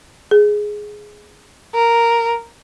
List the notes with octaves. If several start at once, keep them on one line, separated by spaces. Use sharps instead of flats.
G#4
A#4